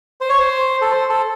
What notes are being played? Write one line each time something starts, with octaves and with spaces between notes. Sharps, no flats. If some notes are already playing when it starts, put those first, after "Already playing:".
C5
C#5
C5
A4
C5
A4